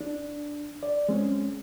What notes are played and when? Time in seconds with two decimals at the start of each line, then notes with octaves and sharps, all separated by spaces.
0.01 D4
0.83 D5
1.09 G#3 C4 C#4